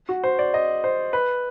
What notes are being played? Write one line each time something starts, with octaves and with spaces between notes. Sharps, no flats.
F#4
C5
D5
D#5
C5
B4